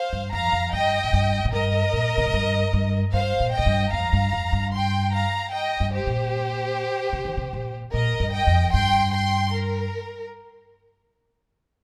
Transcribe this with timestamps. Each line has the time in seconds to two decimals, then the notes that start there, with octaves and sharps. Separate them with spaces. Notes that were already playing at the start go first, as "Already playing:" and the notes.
Already playing: C5 F5
0.13 G2
0.33 F2 F5 A#5
0.53 F2
0.73 G2 D#5 G5
1.04 A#2
1.13 G2
1.45 A#2
1.52 G2 A#4 D#5
1.93 A#2
2.18 C3
2.26 A#2
2.34 G2
2.73 G2
3.13 G2 C5 F5
3.40 A#2
3.54 D#5 G5
3.59 A#2
3.66 G2
3.93 F2 F5 A#5
4.13 G2
4.33 F2
4.53 G2
4.73 G5 C6
5.13 F5 A#5
5.53 D#5 G5
5.80 G2
5.93 G4 C5
6.07 A#2
7.13 C3
7.25 D#3
7.37 C3
7.53 A#2
7.94 A#2 A#4 D#5
8.20 G2
8.33 D#5 G5
8.47 F2
8.74 G2 G5 C6
9.13 G5 C6
9.54 A#4